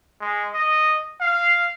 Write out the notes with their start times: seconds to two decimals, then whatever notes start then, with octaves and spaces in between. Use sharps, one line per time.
0.21 G#3
0.53 D#5
1.21 F5